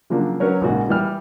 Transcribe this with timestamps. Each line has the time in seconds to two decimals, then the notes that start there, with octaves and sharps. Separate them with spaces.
0.10 C#3 F3 F#3 A#3 D4
0.40 F#3 C#4 A#4 B4 C#5
0.61 A#1 G#2 C#3 F#4
0.89 E3 G3 F6